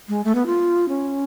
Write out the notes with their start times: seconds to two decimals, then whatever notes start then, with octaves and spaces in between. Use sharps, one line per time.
0.08 G#3
0.24 A3
0.35 B3
0.46 F4
0.89 C#4